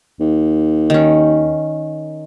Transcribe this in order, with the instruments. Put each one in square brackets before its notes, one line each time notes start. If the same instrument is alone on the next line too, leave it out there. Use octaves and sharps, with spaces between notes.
[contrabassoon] D#2
[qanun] D#3 C#4